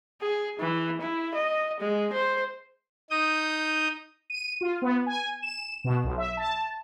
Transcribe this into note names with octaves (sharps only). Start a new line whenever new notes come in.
G#4
E3
E4
D#5
G#3
C5
D#4 D#6 G6
D#7
F4
B3
G#5
E7
B2
B1
E5
A5